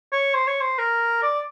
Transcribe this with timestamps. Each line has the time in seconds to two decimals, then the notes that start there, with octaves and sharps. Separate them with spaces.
0.12 C#5
0.35 C5
0.48 C#5
0.61 C5
0.79 A#4
1.23 D5